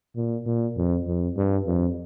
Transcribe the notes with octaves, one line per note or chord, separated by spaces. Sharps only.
A#2
A#2
F2
F2
G2
F2